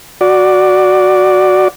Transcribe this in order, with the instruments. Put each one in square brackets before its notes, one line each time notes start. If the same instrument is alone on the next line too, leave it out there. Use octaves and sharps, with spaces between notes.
[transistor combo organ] F#4 D5